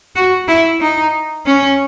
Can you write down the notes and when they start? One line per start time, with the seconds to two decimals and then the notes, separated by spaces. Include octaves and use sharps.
0.16 F#4
0.48 E4
0.81 D#4
1.46 C#4